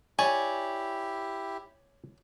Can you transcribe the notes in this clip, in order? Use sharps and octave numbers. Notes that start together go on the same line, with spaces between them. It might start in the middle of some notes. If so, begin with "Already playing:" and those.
E4 G4 C#5 D5 G#5